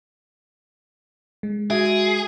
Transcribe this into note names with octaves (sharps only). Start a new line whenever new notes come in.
G#3
F#4 G#4 E5 D7